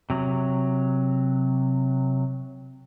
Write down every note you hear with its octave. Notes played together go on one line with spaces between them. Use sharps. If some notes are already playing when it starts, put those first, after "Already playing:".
C3 F#3